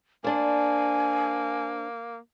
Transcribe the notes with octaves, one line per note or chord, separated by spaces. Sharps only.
A#3 D4 C5 G#5